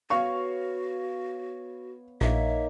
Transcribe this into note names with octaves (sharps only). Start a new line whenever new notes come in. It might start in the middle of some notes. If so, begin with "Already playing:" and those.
B3 F#4 C#5 F5 C#6
A#1 A#3 D#4 C#5 E5